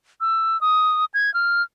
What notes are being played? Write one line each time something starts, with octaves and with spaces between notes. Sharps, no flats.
E6
D#6
G#6
F6